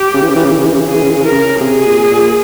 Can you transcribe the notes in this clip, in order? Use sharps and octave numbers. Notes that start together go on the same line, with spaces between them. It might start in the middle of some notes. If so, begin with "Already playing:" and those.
Already playing: G4
C#3
E3
C#3
E3
C#3
E3
C#3
E3
C#3
E3
C#3 G#4
E3
C#3
E3
C#3
E3 A#4
C#3
C3 G#4
A#2
A#2